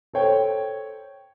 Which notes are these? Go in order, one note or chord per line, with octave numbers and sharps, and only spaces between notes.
A4 C5 C#5 G5